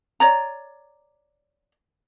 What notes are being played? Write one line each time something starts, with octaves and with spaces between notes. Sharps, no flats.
C#5 D5 A#5